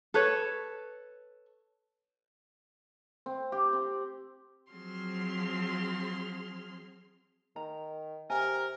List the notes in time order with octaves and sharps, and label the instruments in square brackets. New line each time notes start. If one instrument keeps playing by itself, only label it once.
[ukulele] A4 B4 C#5
[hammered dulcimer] C4
G4
C4
[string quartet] F3 F#3 C4 G#4 C6 F6
[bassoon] D#3 [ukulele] A#5
[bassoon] C3 [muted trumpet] A#4 [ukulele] G#5